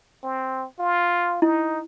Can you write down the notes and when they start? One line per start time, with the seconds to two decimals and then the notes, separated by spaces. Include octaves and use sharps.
0.23 C4
0.79 F4
1.42 D#4 E4